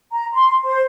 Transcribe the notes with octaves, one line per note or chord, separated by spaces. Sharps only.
A#5
C6
C5